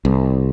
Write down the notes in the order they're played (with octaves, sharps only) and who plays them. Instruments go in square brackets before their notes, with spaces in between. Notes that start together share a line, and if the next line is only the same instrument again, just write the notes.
[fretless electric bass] C2